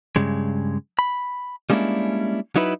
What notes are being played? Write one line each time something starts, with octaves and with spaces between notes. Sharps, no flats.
G2 C#3 G#3
B5
G3 G#3 A#3 C#4 D4 E4
F#3 D#4 E4 B4